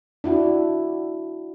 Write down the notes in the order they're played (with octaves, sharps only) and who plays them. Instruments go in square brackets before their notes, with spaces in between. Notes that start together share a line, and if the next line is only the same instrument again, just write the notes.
[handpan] D4 E4 F#4